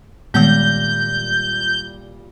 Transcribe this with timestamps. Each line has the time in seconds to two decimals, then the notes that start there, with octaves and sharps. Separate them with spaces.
0.34 A#2 D#3 G3 G#3 B3 G6 A#6